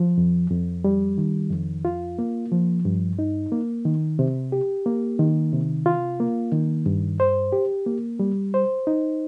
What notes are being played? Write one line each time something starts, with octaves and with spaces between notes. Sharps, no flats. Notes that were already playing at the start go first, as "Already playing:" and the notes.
Already playing: F3
F2
F2
G3
D#3
F2
F4
A#3
F3
G2
D#4
A#3
D#3
C3
G4
A#3
D#3
C3
F4
A#3
D#3
G2
C5
G4
A#3
G3
C5
D#4